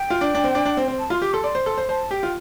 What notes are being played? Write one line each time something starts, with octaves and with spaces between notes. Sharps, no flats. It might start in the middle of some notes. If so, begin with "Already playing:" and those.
Already playing: G5
F4
D4
D4
C4
D4
D4
C4
C4
A5
F4 C6
G4 D6
A4 C6
D5 C6
C5
A4
C5
C5 A5
G4 G5
F4